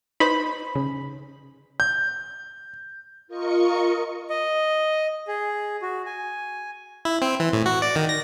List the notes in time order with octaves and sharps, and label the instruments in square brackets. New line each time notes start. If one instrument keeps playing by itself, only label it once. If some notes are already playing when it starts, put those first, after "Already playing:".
[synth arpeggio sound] D#4 B4 C5 [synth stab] B5
[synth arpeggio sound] C#3
[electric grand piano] G6
[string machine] F4 A#4 D#5 C#6 C#7
[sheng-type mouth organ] D#5
G#4
F#4
G#5
[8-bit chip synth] E4
C4
E3
A2
F#4
D5
D#3
A#6